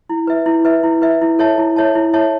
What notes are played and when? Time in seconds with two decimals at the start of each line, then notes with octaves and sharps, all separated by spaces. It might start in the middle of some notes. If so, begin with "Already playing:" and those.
0.10 E4
0.27 B4 E5
0.46 E4
0.65 B4 E5
0.83 E4
1.02 B4 E5
1.21 E4
1.39 A4 C#5 E5 A5
1.58 E4
1.76 A4 C#5 E5 A5
1.95 E4
2.14 A4 C#5 E5 A5